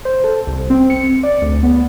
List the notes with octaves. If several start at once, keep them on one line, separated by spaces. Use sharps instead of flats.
C5
A4
C2
C4
C#7
D5
D2
B3